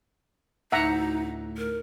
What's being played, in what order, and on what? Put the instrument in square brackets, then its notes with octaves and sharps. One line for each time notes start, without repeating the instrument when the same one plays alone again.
[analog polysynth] D2 A2 [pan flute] D#4 [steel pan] E5 F#5 A#5
[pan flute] A#4